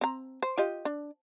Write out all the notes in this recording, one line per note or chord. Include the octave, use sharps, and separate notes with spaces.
C4 A#5
C5
F4 G4 D#5
D4